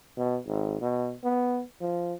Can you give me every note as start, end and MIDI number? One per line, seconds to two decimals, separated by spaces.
0.17 0.39 47
0.47 0.80 32
0.81 1.15 47
1.24 1.62 59
1.81 2.14 53